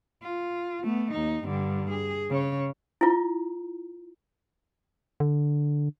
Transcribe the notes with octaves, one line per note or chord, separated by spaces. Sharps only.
F4
A3 B3
D#2 D#4
G2 D3
G#4
C#3 C#5
E4 F4
D3